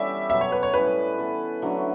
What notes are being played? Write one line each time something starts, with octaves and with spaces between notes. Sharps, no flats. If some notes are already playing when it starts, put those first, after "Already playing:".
Already playing: E3 G3 B3 C#4 G4 A4 E5
B2 F#3 B3 E5
C#5
B4
C#5
A2 G3 C#4 E4 B4
E3 B3 E4 A4
D3 F#3 A3 C#4